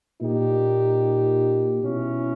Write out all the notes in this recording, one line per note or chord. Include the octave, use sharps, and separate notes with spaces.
A#2 D#4 G4
B2 C#4 E4